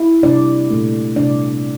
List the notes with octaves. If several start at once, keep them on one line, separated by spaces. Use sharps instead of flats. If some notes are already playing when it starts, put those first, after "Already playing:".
Already playing: E4 E5
C3 G3 A#3 D4 D5
A#2 A3
C3 G3 A#3 D4 D5